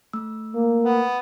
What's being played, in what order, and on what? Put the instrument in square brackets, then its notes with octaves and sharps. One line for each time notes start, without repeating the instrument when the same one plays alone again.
[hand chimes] A3 E6
[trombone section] A#3
[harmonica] B3